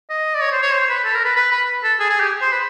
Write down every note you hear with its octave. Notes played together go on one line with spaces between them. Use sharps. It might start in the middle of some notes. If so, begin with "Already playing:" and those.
D#5
D5
C#5
C5
C#5
C5
B4
A4
A#4
B4
B4
B4
A4
G#4
G#4
G4
C5
B4